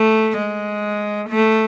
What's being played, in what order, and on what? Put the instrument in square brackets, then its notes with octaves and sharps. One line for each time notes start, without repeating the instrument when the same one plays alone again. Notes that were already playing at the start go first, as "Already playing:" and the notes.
Already playing: [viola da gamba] A3
G#3
A3